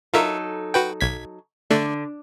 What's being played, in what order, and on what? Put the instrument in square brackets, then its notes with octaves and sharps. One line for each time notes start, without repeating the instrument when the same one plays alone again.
[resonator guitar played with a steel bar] F#3 D#4 A4 [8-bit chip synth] F4 A#4 E5
[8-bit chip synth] F#4 B4 G5
B1 G#6 B6
[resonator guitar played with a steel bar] D3 [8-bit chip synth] A3 D4